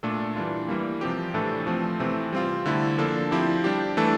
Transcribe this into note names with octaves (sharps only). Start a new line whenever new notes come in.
A#2 A3 D4 A4
E3 G3 D4 F4
E3 G3 A#3
C3 F3 C4 G4
A2 E3 A3 D4 A4
F3 A3 C4
C3 E3 A3 C4
G3 C4 F4
D3 A3 E4 A4
F3 A#3 D4 A4
F3 C4 E4 G4
G3 D4 G4
E3 A3 D4 A4